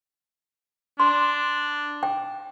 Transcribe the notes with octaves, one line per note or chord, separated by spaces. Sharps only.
D4 C6
G5